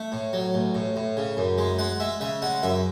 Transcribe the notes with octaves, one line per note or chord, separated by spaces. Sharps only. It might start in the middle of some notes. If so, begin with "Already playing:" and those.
Already playing: A3
A2
F#3
A1
A2
A2
C#3
F#2
G#3
G#3 F#5
G#3 E5
C#3 E5
G#3 F#5
F#2 E5